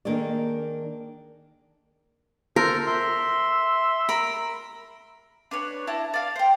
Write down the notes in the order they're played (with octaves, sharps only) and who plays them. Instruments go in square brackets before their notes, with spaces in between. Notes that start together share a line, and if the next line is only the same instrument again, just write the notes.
[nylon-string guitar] D#3 A#3 D4 G#4 A4 D5
[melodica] A4 C5 [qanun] A#4
[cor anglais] E5 [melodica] C6
[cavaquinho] A#4 B5
[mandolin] D4 B4 C#5
E4 A5 A#5
D5 F5
C5 G5